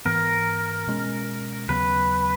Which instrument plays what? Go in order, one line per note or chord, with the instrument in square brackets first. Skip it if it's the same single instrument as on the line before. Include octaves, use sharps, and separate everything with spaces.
[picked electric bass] G#2 E3 B3 [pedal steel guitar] A#4
[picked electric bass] B2 G#3 C#4
[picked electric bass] D#2 C#3 F#3 B3 [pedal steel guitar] B4